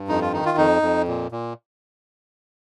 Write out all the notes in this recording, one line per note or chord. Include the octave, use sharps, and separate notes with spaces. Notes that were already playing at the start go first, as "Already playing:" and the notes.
Already playing: G2
F2 D#4
F4
D#3 D#4
F4
F2 D#4
F2
A#2
A#2